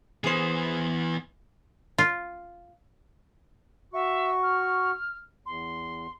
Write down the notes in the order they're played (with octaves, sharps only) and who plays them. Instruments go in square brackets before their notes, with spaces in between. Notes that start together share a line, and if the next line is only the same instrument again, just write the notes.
[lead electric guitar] E3 B3 [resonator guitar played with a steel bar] G#4 C5
[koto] F4
[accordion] F#4 C#6 [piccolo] E5
[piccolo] F6
[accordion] E2 [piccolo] C6